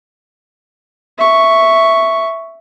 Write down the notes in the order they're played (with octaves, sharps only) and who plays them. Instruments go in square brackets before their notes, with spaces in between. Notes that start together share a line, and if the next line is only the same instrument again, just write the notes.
[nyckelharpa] E5 C#6